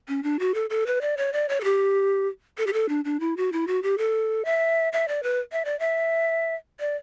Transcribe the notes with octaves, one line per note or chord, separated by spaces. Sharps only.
C#4
D4
F#4
A4
A4
B4
D5
C#5
D5
C#5
A4
G4
A4
G4
A4
D4
D4
E4
F#4
E4
F#4
G4
A4
E5
E5
D5
B4
E5
D5
E5
D5